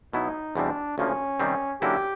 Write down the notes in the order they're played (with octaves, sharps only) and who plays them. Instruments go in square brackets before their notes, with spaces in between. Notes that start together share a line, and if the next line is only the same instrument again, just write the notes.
[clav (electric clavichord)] B2 F#3 B3 E4 [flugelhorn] D#4
[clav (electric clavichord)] E2 B2 G3 C4 [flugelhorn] D4
[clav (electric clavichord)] D2 C#3 F3 A#3 [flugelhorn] C#4
[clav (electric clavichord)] C3 D#3 G3 C4
[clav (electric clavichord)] D3 F#3 A#3 C#4 E4 [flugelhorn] G4